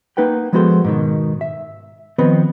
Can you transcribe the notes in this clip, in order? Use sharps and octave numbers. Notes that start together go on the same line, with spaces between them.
A#3 D#4 B4 F#5 G5
F3 G#3 B3 F#4 A4 C5
G#2 B2 D#3
E5
D#3 F3 B3 C4 B4 D#5